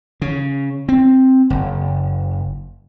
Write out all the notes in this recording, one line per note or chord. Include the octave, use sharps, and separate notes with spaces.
C#3
C4
F#1